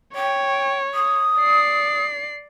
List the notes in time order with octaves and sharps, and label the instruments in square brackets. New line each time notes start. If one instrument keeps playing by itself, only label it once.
[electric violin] C#5 [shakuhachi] G5
[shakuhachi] D#6
[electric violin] D5 C7